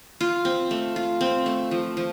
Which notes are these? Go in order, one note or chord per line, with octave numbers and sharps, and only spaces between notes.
F4
C4
A3
F4
C4
A3
F3
F3